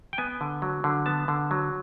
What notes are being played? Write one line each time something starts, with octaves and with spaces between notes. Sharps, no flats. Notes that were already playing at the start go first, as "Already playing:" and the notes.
G5
B3 G#5
D3
F#3
D3
B3 A5
D3
F#3